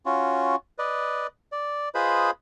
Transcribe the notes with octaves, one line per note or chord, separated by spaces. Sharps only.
C#4 F4 F#4
B4 D5 D#5
D5
F4 G#4 B4 C5 D#5 B5